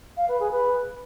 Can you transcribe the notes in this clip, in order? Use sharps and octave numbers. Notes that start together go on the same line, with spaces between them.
F5
B4
G#4
B4